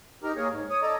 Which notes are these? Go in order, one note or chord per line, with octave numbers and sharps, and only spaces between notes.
D#4 G4 A#4 A#5
A#3 G#4 A#4 C#5
G#2
C#5 D#6
A4 D5 D#5 A#5